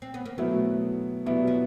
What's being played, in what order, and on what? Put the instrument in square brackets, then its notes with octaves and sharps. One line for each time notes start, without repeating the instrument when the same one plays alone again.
[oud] C4
B3
A#3
[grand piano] B2 F#3 B3 E4 [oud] A3
[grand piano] B2 F#3 B3 E4 [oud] G3
[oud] F3